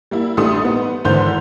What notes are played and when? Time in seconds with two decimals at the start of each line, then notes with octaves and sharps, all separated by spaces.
0.11 G3 A#3 E4
0.37 A1 G3 A3 D4 C6 D#6
0.61 B3 D#4
1.05 G#1 D3 E3 C5 C6 G6